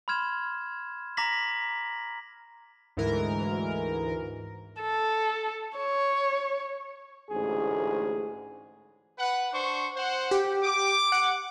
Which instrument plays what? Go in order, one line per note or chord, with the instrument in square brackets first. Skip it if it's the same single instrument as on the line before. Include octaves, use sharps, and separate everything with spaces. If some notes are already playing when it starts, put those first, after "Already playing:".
[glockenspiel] B5 C6 F6 G#6 E7
A#5 D6 A#6 B6 F#7
[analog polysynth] D2 G#2 E3 A#4
[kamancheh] A4
C#5
[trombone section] A1 D2 G#2 G#4
[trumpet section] B4 F#5
D4 C5 C#6
C5 F#5
[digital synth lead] G4
[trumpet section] D6
[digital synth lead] F#5